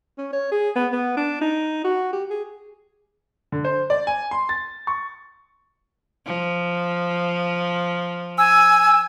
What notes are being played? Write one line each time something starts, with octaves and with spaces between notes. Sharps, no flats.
C#4
C#5
G#4
B3
B3
D4
D#4
F#4
G4
G#4
D3
C5
D5
G#5
C6
A6
C#6
F3
G#5 E6